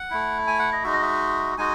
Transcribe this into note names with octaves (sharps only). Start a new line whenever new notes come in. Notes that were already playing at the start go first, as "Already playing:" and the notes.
Already playing: F#5
A3 E4
G#5
F#5
D#5
G#3 D#4 F#4 E5
D#5
E5
G#3 D#4 F#4 G#5